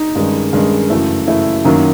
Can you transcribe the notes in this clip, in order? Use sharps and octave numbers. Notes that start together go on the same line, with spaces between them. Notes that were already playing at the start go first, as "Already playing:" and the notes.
Already playing: D#4
G2 D#3 G#3 C#4
G2 D#3 G#3 C#4
F#2 C#3 E3 A3
F#2 C#3 E3 A3 E4
F#2 D#3 F#3 A#3 C#4